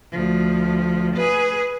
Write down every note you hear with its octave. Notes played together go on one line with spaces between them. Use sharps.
D2 F3
G#4 B4